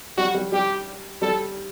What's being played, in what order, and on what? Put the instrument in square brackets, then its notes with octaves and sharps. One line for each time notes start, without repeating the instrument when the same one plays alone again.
[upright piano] G3 [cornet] F#4
[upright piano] G3
[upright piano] G3 [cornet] G4
[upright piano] G3 [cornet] A4